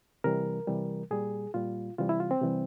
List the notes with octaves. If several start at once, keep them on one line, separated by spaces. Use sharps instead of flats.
C3 E3 G3 A#4
C3 E3 G3
A#2 G3 G#4
A#2 G3 F4
C3 E3 G3 F4
E4
F4
C4
C3 E3 G3